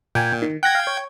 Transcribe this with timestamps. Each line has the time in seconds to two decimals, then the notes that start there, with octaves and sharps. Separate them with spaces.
0.15 A#2 G5 G#5
0.42 D#3
0.63 F#5 G5 F#6 G#6 A#6
0.75 F5
0.87 C#5